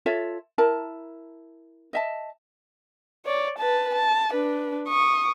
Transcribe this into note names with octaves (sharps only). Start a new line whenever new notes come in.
F4 A4 C#5 E5
E4 A#4 A5
D#5 E5 A5
C#5 D5
B4 A5
A5
D4 B4
C#6 D#6